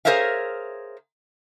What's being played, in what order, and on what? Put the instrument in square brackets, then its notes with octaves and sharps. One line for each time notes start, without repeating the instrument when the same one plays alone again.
[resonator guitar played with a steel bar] G#4 A#4 C5 C#5 E5 F5